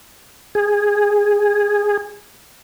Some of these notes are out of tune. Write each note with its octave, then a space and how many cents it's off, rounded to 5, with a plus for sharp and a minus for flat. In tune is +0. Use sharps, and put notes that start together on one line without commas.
G#4 -10